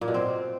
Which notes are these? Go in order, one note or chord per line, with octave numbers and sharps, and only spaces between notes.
A#2
B2
C4